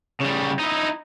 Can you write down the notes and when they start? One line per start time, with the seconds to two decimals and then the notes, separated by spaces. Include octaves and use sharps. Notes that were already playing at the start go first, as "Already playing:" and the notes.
0.20 C#3 G3
0.59 D#4 E4